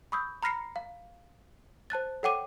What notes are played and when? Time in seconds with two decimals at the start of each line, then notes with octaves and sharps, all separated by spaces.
0.12 B5 C#6 D#6 E6 G6
0.43 A#5 B5 F6 A#6 C7 C#7
0.76 F5
1.90 C5 A5 F#6 A6
2.23 A4 C#5 F#5 G5 D6 D#7